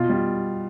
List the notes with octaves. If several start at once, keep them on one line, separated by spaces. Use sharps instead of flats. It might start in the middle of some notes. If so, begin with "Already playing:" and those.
Already playing: B2 F4
G3